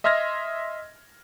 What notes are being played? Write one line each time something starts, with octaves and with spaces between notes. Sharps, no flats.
D#5 E5 C6 F6 G#6 A#6